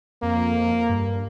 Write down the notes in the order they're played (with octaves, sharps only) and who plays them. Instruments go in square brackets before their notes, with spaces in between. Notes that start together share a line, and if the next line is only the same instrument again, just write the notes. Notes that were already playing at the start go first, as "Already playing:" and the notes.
[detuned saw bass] F2 [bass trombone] A#3
[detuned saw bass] G2